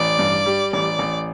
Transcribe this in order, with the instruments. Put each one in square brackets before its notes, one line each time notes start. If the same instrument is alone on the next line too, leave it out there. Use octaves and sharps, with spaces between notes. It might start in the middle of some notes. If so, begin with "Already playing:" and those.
Already playing: [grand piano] A1 [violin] D5
[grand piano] G2
G3
[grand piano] A1 [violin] D5
[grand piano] A1